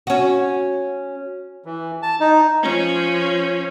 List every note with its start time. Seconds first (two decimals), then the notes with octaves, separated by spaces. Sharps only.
0.07 C#4 F#4
1.66 E3
2.02 A5
2.20 D#4
2.62 F3 C#4